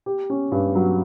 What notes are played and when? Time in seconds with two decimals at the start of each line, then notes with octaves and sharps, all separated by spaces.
0.06 G4
0.30 C#4
0.52 G2
0.75 F#3